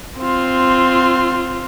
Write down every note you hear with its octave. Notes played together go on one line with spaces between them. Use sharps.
C4 F4